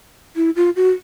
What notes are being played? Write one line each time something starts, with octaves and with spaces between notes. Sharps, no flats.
E4
F4
F#4